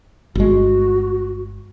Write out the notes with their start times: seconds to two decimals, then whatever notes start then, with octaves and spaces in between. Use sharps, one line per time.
0.35 G1 G#3 F#4